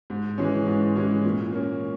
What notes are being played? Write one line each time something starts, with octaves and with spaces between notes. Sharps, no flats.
G#2
E3 G#3 C#4
G#2
E3 G#3 C#4
A#2
A#3 C#4